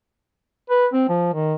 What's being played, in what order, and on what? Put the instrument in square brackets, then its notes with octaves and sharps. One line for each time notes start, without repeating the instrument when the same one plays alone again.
[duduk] B4
C4
F3
D#3